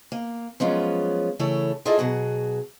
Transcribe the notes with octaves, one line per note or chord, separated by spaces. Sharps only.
A#3
F3 F#3 G#3 B3 C#4 F4
C#3 E3 A3 E4 A4 C#5
E4 F4 G#4 A4 D5 D#5
B2 F#3 F#4 G#4